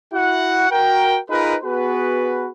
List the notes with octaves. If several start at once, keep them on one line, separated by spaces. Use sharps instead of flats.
E4 F#4 F#5
F#4 A#4 G5
D#4 F4 G#4 A#4 B4
B3 F#4 G#4 B4